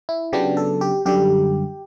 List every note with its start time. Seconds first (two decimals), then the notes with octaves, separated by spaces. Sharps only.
0.09 E4
0.33 C#3 F#3 B3 D4 G4
0.57 A4
0.81 G4
1.06 F#2 D3 G3 G4